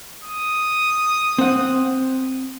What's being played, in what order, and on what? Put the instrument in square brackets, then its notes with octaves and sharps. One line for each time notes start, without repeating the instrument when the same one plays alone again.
[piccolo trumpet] D#6
[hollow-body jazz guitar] C4 F#5